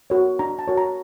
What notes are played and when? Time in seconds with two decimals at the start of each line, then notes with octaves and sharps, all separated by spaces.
0.10 F#4 A#4 C#5
0.39 D4 A#5
0.59 A5
0.68 F#4 A#4 C#5
0.77 A#5